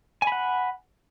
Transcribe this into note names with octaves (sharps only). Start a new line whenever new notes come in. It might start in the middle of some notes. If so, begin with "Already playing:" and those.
F#5 G#5 B5